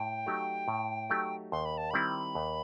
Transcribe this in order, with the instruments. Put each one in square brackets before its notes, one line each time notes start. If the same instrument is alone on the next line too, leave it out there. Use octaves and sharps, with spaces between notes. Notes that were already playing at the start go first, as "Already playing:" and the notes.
Already playing: [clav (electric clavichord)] A2 [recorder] G5
[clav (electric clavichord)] F#3 A3 D#4 G4
A2
F#3 A3 D#4 G4
[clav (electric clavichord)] D#2 [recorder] C6
[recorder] B5
A5
[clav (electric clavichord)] D#3 G3 C4 E4 [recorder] B5
[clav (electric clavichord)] D#2